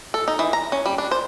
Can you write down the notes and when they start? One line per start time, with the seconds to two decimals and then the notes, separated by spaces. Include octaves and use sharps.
0.14 A4
0.28 D#4
0.39 E3
0.53 A#5
0.72 C#4
0.86 G3
0.98 D4
1.11 C5